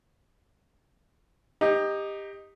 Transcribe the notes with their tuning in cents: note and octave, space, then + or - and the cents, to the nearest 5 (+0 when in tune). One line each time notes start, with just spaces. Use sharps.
D#4 +0 G4 +20